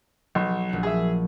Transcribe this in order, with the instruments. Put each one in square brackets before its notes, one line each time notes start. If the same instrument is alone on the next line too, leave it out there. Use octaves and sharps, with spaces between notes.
[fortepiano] B1 [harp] F#3
[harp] A#1 F#5
[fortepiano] G#4 E5